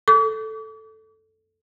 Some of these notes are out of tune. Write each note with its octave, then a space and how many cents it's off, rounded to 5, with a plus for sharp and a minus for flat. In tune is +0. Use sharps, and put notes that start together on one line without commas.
A4 +0 D6 -40